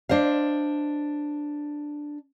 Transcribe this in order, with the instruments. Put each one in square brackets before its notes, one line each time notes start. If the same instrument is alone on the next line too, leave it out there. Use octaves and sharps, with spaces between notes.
[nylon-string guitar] D4 C5 D#5 F5